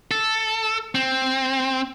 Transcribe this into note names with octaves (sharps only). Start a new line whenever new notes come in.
A4
C4